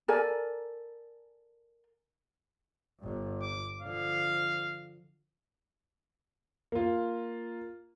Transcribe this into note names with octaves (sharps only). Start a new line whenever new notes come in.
A4 A#4 D5 G#5
G1 G2
D6
D3 F3 F5
A#3 F4